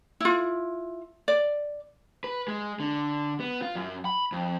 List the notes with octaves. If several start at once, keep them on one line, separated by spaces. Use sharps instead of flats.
E4 F4
D5
B4
G#3
D3
B3
F4
F#2
B5
F2